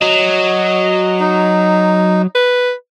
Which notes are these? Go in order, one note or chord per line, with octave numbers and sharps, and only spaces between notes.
F#3 D#5
D#4
B4